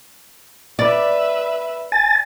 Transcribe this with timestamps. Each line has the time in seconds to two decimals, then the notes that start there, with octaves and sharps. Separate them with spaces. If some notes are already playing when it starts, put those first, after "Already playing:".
0.79 B4 D5 E5
1.92 G#5 A6